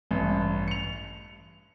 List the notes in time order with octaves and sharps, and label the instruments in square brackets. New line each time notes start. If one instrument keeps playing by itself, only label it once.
[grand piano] A1 G2
C#7 F7